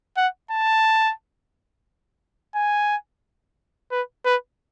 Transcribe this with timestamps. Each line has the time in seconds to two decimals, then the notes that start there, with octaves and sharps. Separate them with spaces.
0.17 F#5
0.51 A5
2.55 G#5
3.91 B4
4.26 B4